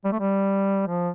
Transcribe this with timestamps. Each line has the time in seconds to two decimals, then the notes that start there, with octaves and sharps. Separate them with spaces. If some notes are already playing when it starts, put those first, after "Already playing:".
0.04 G3
0.12 A3
0.19 G3
0.88 F3